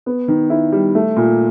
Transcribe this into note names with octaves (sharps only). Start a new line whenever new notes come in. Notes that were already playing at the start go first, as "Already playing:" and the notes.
B3
D#3
E4
G3
A3
A#2